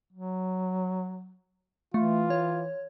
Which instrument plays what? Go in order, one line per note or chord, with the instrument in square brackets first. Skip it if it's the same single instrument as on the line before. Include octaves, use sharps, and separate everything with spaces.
[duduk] F#3
[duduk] E3 [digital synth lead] A3 [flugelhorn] F4
[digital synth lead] C#5